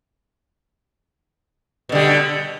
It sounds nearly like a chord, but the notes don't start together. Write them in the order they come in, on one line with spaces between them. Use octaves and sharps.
B2 D3 G3